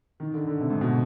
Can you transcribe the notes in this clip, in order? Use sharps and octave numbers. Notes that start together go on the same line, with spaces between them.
D#3
D3
D3
C3
G#2
B2